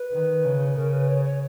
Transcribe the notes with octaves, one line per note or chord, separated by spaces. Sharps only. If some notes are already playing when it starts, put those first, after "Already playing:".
Already playing: B4
D#3
C#3
C#3 A#4
B4
C#5
C#5